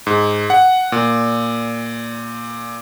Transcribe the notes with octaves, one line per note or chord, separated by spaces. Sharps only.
G#2
F#5
A#2